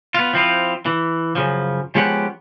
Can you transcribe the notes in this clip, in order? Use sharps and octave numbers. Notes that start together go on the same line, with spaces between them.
B3 F4
F3 C4 E4 F4
E3
F#2 C#3 F3
F3 G#3 B3 C#4 G4 F#5